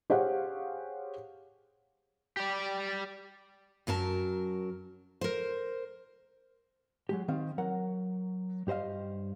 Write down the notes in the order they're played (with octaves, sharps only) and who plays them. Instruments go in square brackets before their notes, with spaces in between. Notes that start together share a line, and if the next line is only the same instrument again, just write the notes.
[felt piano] G4 G#4 C5 C#5 F5 F#5
[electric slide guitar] G4 D5
[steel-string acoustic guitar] F#2 F#3 A#4 A5
A#4 C5
[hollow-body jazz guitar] F#3 G#3 G4
D#3 C4 F5
F#3 A#4 F#5
G2 G4 C5 D#5 F5